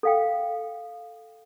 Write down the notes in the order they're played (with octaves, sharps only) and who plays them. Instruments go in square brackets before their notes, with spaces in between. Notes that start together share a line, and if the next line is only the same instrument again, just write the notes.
[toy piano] A4 F5 G5